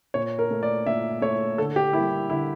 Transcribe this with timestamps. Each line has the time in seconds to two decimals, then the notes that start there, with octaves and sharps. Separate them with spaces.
0.14 A#2 C#5
0.39 A#4
0.51 A3
0.63 D5
0.86 A#2 E5
1.22 A3 C#5
1.58 D3 A4
1.76 G4
1.93 G3 A#3 E4
2.29 D3 E4